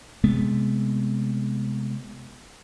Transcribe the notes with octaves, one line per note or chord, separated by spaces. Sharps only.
C3 G#3 A3 B3